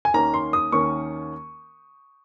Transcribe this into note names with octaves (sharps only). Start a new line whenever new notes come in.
G#5
D#2 D#3 A#3 C#4 A#5
C6
D#6
D#2 D#3 A#3 C#4 C#6